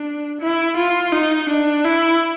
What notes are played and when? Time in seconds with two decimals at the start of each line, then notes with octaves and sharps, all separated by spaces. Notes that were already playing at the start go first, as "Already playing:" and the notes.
Already playing: D4
0.41 E4
0.77 F4
1.13 D#4
1.49 D4
1.85 E4